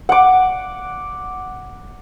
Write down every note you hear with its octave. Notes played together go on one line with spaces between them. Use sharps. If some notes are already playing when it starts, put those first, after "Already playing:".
F#5 D6